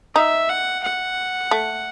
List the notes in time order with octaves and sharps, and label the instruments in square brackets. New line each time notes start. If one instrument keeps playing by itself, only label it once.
[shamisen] D#4 [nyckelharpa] E5
[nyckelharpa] F#5
F#5
[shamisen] A3